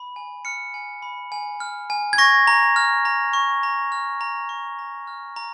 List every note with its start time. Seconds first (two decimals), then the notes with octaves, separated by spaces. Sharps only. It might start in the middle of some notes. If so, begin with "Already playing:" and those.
Already playing: B5
0.16 G#5
0.45 F6 C#7
0.74 G#5
1.02 B5
1.32 G#5
1.60 F6
1.90 G#5
2.13 G#6
2.18 C#6 A#6
2.47 A#5
2.76 F6
3.05 A#5
3.33 C#6
3.63 A#5
3.92 F6
4.21 A#5
4.49 C#6
4.79 A#5
5.07 F6
5.36 A#5